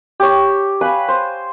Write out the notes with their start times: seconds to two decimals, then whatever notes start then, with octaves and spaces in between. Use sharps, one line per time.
0.20 G4 C#5
0.81 B4 F5 G#5 B5
1.08 C5